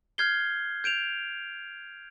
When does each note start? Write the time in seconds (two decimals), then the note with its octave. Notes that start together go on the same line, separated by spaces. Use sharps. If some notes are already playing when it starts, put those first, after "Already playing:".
0.18 F6 G6 G#6 C7 G7
0.84 G6 D7 E7 F7